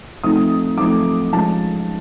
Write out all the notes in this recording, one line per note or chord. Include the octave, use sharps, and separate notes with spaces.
F3 A3 C4 D#4 D#6
F3 A3 C4 D#4 D6
F3 G#3 C#4 A5